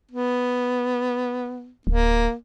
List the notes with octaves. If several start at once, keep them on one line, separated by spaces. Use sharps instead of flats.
B3
D1 A#3